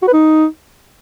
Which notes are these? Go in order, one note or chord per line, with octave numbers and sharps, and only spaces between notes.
F#4
B4
D#4